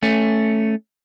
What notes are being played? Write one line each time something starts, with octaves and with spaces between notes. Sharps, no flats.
A3 C#4